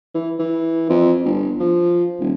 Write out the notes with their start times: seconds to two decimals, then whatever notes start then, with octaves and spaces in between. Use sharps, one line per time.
0.15 E3
0.39 E3
0.90 F2
1.25 G1
1.60 F3
2.20 D#1